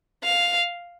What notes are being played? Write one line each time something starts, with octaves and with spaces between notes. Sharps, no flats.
F5